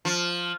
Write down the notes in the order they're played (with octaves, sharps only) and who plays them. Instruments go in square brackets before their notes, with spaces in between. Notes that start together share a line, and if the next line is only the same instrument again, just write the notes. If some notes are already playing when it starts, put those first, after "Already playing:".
[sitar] F3